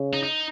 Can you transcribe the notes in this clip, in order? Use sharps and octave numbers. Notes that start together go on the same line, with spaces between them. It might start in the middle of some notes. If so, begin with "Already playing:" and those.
Already playing: C#3
D#4
D#4